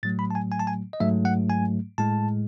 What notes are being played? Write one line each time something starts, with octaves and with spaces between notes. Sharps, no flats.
A2 F#3 A3 A6
B5
A5
G#5
G#5
A5
G#5
D#5
G#2 F#3 A3 E5
F#5
G#5
A2 G#3 A5